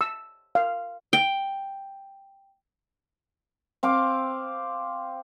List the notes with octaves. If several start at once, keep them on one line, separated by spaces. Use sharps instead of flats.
E6
F5
G5
C4 F5 D6